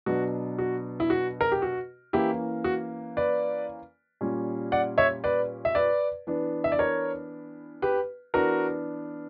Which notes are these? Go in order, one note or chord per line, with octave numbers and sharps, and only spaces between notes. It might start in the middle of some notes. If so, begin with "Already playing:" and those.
B2 F#3 B3 D4 F#4
F#4
E4
F#4
A#4
G4
F#4
E3 A#3 C#4 E4 G4
F#4
B4 D5
A#2 G3 C#4
D5 F#5
C#5 E5
B4 D5
E5
B4 D5
E3 B3 D4
E5
D5
A#4 C#5
G4 B4
E3 B3 D4 F#4 A#4